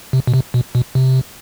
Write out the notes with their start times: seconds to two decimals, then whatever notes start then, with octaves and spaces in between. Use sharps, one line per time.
0.13 C3
0.27 B2
0.34 C3
0.54 B2
0.75 B2
0.95 C3